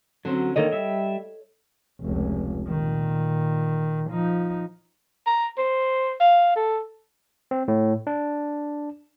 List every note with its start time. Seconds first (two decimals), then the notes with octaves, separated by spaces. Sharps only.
0.25 D3 F#3 C4 C#4
0.56 D3 D#3 A#3 A4 C#5 D#5
0.72 G3 E5
2.02 F1 C#2
2.68 A#2 D#3
4.11 F3 D#4
5.27 A#5
5.58 C5
6.20 F5
6.56 A4
7.51 C4
7.68 A2
8.07 D4